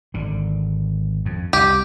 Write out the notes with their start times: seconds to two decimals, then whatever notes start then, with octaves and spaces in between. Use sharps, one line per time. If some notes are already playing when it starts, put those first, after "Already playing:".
0.14 G#1 D3
1.25 F2
1.53 C2 C3 G4